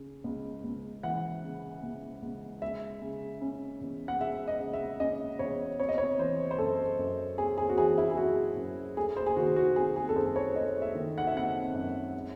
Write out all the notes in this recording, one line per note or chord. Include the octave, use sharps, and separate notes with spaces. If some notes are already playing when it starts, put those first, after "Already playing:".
Already playing: C#3
C#2
C#2
E3 F#5
C#3
C#2
C#2
G#3 E5
C#3
C#4
E2
F#5
G#3 E5
D#5
C#3
E5
C#4 D#5
E2 C#5
C4 C#5
D#5
C#5
E3 C5
C5
F#2 A4
F#2
C4 G#4
G#4
F#4
E3 G#4
E4
G#4
F#2 F#4
F#2
A3 G#4
C5
G#4
D#3 F#4
F#4
C4 G#4
G#4
A4
F#2 C5
C#5
A3 D#5
E5
D#3
F#5
E5
C4 F#5
F#2
G#3